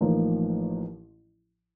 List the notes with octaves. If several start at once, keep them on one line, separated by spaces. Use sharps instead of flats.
A1 A2 F3 A#3 D#4